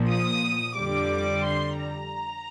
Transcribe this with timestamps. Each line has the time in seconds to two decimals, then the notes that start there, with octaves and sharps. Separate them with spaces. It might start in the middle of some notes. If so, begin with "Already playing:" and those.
Already playing: A#2 F3
0.10 D#6
0.77 F2 D3 G3 D6
1.45 C6
1.79 A#5